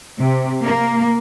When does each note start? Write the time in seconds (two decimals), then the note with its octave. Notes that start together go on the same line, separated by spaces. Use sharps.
0.22 C3
0.64 A#3